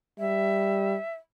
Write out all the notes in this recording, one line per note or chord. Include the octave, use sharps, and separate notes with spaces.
G3 E5